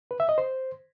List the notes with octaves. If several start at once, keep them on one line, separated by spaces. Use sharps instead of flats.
B4
E5
D#5
C5